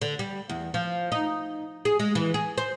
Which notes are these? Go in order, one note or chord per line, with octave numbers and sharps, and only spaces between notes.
D3
G3
E2
F3
D#4
G#4
G#3
E3
G#4
C5